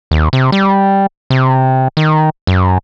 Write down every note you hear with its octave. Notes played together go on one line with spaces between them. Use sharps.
D#2
C3
G3
C3
D#3
F#2